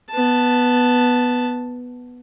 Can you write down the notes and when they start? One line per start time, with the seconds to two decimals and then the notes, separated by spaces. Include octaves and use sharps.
0.11 B3 A5